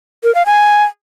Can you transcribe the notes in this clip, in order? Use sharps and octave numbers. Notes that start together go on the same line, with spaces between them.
A#4
F5
G#5